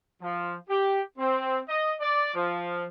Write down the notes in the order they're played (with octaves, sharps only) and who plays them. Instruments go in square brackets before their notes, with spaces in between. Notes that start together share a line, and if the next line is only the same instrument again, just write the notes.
[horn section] F3
G4
C4
D#5
D5
F3